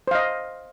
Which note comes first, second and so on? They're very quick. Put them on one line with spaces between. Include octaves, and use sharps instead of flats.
C5 F5 D#5